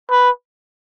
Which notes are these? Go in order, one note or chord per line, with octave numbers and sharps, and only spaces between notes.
B4